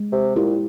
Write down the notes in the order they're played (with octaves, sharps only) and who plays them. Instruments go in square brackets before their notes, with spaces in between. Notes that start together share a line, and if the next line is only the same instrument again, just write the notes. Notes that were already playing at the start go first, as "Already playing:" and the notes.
Already playing: [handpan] G#3
[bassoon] C3
[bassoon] A#2 [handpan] E4 G4